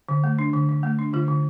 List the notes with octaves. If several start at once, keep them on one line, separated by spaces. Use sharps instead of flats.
D3
A3
D4
D3
D3
A3
D4
D3 F4
D3